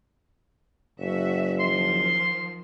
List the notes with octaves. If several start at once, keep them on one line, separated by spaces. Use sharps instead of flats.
F#1 F#4 E5
D#3 F3 C6